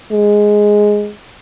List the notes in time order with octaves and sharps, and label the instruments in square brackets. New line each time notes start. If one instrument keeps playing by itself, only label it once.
[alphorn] G#3